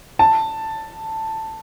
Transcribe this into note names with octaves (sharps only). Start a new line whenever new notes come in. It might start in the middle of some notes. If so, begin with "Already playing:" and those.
A5